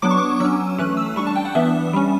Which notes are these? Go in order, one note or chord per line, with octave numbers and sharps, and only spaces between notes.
F#3 B3 D4 D6
C#6
D6
F#3 C#4 E6
E3 A3 C#4 F#6
E6
G3 D4 C#6
A5
G5
F#5
E3 B3 D4 E5
G3 C#4